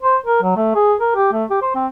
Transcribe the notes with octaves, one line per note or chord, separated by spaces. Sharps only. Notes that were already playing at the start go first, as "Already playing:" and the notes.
C5
A#4
F#3
A3
G#4
A#4
G4
A3
G4
C5
C4